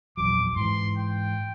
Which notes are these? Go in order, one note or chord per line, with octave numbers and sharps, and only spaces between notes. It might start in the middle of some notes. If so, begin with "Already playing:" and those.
A#1 E2 F#3 D6
G#2 E3 C6
G5